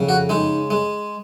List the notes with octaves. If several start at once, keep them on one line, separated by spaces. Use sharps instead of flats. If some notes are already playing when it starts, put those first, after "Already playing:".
Already playing: F2 C#3
F#4
G#3 D#4
G#3